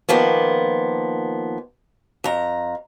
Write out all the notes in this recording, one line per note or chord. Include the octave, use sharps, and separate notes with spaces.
D#3 F3 A#3 B3
F2 A#5